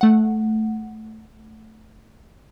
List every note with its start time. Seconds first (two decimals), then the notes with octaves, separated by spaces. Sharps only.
0.01 A3 F#5